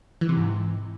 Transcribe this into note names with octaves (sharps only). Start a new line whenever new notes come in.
E3
C3
G#2